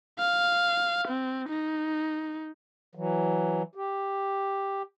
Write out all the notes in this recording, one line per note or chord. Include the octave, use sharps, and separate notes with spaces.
F5
C4
D#4
E3 F#3
G4